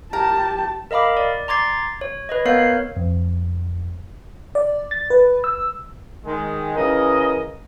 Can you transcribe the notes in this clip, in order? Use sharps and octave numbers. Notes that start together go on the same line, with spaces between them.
G4 A#4 A5
A#4 D#5 F5 B5 D6
D5
A#5 C6 D6 G#6 A6 C7
C#5
B4 C#5 D#5
B3 A#4 C#5 F5 G6 C7
F2
D5
A6
B4
E6
D#3 G#3
C#3 E3 A#4 D#5